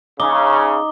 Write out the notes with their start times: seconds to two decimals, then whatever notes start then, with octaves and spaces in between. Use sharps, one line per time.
0.20 C#3 D#4 D6 D#6 G7